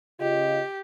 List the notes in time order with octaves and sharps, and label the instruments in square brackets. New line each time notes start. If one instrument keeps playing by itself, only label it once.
[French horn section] C#3 F4 D#5 [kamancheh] G4